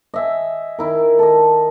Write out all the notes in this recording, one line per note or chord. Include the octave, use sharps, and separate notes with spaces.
D#5 E5 G#5
D#3 E4 A#4
A4 D#5